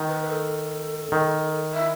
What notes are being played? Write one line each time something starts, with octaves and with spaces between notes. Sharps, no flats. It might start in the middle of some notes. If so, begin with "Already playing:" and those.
Already playing: D#3
B4
B4
A4
D#3
E5